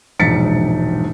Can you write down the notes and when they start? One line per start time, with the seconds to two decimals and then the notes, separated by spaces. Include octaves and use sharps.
0.19 E1 A#1 G#2 A6 B6 C#7